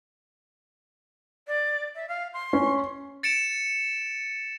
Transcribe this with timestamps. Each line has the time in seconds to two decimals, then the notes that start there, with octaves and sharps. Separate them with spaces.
1.48 D5
1.95 E5
2.09 F5
2.34 C6
2.53 C#4
3.23 A6 C#7 D7 E7